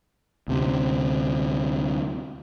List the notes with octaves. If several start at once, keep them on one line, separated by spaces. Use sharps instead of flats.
D2 C3